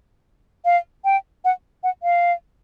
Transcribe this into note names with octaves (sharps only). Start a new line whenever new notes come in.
F5
G5
F#5
F#5
F5